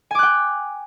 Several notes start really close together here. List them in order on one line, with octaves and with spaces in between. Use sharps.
G#5 D6 F#6 G5